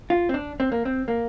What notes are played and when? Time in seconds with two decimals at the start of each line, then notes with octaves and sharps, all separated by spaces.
0.10 F4
0.29 C4
0.34 D4
0.60 C4
0.72 A#3
0.85 C4
1.08 A#3